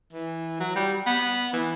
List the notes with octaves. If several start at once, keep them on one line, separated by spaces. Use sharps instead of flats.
E3
F#3
G3
B3
E3